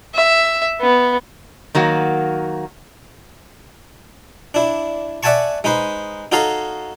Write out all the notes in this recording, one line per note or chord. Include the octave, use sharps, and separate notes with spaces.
E5
B3
D#3 F#3 A#3 F#4
D4 E4
D5 E5 F#5 G#5 A5 C#6
G#3 D#4 B4 C5
D#4 F#4 A4 C#5 F5 A#5